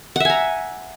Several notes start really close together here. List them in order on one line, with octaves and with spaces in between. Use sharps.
F#5 E5 G#5 A#5